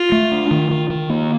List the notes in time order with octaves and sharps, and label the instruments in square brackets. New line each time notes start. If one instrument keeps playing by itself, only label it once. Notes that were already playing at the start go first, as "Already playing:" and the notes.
Already playing: [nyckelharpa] F4
[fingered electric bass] A3
D4
D#3
D#3
D#3
A#3